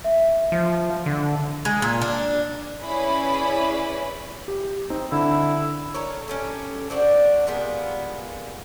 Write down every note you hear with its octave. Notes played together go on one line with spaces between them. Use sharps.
E5
F3
D3
G#3
A#2
D4
C#4 E4 G#4 B4 D5 B5
G4
C4 D#4
D3 E4
A4 A#4 C#5
C#4 G4 A4
C4 D4 E4 F#4
A#2 G3 G#3 B3